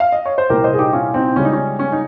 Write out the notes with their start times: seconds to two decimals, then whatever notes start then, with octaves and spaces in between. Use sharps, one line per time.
0.00 F5
0.12 D#5
0.26 C#5
0.38 C5
0.50 C2 A#2 G3 G4 A#4
0.64 C5 D#5
0.73 G#4
0.78 D#4 G4
0.93 C#4 F4
1.14 C4 D#4
1.36 C#2 C#3 G3 C#4
1.45 D#4
1.53 C#4
1.79 C#4
1.92 D#4